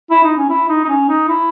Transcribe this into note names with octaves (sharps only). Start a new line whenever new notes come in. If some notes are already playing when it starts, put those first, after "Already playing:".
E4
D#4
C#4
E4
D#4
D#4
C#4
D#4
E4